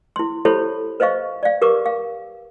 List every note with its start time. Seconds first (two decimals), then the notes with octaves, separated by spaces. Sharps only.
0.16 E4 C6
0.45 E4 G4 A4 C5 C#5 B5
1.00 B4 C5 D#5 F5 C#6
1.43 D5 F5
1.62 G4 A#4 B4 C#6 D6
1.86 F5